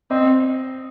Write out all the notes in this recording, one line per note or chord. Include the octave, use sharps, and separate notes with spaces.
C4 D#5